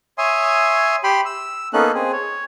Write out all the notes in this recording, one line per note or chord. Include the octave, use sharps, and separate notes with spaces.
C#5 E5 G#5 C6 D#6
G4 G5 B5 C6
E6
A#3 B3 C#4 D#4 A4 F#6
C4 G#4
C#5